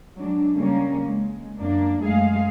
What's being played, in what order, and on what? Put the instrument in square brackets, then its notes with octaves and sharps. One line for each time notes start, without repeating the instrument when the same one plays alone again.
[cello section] F#3 G#3 D4
C#3 G3 A#3 C#4
G#3
F#2 A#3 D4
F#2 G#3 A3 G#4 F5